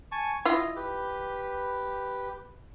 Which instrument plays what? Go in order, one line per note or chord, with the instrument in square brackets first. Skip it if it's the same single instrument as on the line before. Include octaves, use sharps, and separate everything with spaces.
[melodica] G#5 A5 C#6
[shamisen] E4 F4 [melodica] D#5
[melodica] G4 B4